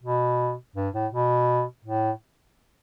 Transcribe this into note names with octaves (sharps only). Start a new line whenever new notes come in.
B2
G2
A2
B2
A2